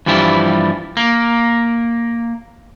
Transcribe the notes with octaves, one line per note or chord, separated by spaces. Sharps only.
G2 E3 F3 G3 E4
A#3